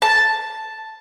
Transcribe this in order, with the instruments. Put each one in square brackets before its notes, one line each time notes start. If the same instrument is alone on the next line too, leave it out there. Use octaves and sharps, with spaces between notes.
[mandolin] A5